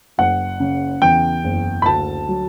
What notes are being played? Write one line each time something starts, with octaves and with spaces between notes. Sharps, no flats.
F#1 F#5
C#3
E2 G5
F#1
B5
D2 A5
F#3